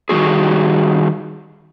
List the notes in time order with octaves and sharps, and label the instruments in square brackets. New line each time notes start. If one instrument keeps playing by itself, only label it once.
[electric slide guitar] D#3 G3 G#3 F#4 G#4